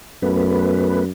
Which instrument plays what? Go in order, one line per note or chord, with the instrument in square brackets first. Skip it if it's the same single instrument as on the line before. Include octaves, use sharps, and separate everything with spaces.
[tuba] F#2 [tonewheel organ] A3 B3 B4